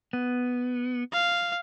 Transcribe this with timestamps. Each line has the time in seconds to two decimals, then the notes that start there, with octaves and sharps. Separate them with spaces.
0.13 B3
1.13 F5